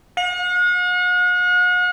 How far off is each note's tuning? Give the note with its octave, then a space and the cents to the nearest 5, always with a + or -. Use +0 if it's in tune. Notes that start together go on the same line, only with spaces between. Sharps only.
F#5 -45